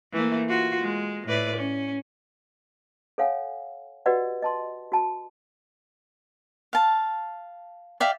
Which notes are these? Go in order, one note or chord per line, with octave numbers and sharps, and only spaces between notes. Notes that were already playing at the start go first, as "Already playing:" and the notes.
E3 A3 A#3
F4 F#4
G#3
A2 B4 D5
C#4
A4 C#5 F5 F#5 G#5
F#4 G4 B4 D5 D#5 F#5
D#5 A5 C6
F#4 A5
F5 A5
D5 E5 F5 G5